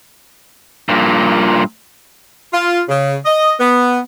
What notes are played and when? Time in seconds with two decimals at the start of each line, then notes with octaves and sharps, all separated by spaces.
0.89 G2 A#2
2.53 F4
2.89 C#3
3.25 D#5
3.60 B3